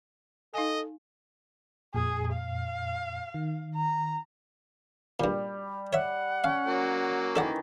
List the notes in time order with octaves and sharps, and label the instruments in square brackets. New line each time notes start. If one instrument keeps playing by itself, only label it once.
[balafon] D#4 F5 G#5 [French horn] A4 [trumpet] D#5
[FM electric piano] F2 A#2 [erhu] G#4
[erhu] F5
[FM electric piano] D#3
[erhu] A#5
[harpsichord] G2 A#2 [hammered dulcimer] G3
[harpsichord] C#5 E5 [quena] F#5
[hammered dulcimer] C#4 [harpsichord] F5
[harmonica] F#3 A#3
[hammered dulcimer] D#3 E3 [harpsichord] A4 D5 F#5